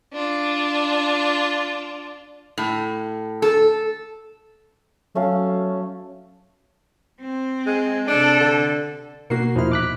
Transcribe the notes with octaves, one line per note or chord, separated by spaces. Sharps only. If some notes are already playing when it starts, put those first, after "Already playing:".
D4 F4
A2
A4
F#3 A3 C#4 F5
C4
G#3
C3 D4 A4
D3
B2 A#3 F#4 C7
E2 A#2 F3 D#4 E4 F6
D6 F#6 B6